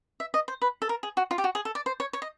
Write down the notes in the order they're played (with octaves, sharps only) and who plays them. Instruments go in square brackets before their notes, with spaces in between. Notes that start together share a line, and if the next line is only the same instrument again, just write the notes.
[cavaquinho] E5
D#5
C5
B4
A4
A#4
G#4
F#4
F4
G4
F#4
G#4
A4
D5
C5
C#5
C#5
D#5